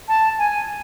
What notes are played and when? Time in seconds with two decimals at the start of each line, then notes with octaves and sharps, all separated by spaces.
0.08 A5
0.39 G#5